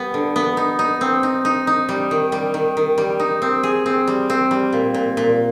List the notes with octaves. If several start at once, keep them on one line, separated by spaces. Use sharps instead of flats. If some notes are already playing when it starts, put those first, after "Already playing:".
Already playing: G3 B3
D3
B3
D#4
D#4
C4
D#4
D#4
D#4
G3
D#3
G3
D#3
D#3
G3
D#4
C4
G#4
C4
G3
C4
G3
A#2
A#2
A#2